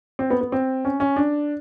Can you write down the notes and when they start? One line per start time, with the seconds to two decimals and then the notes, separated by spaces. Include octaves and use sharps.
0.19 C4
0.30 B3
0.41 B3
0.52 C4
0.85 C#4
1.00 C#4
1.16 D4